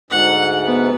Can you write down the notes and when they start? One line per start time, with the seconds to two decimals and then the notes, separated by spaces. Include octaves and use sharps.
0.11 D2 G#2 F#5
0.65 B3